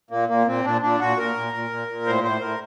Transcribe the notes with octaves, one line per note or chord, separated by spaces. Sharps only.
A#2 A#3
A#2 A#3
A#2 C4
A#2 D4
A#2 D4
A#2 F#4
A#2 A#4
A#2
A#2
A#2
A#2
A2 C5
A2 C5
A2 A#4